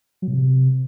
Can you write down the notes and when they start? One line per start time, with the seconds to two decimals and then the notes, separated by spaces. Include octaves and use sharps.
0.22 F#3
0.28 B2
0.33 C3